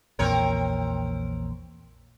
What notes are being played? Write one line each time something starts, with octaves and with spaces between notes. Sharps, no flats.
A#1 E2 A#2 C4 A#4 C#5